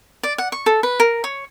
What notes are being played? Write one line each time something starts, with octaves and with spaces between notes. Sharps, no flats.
D5
F#5
C#6
A4
B4
A#4
C#5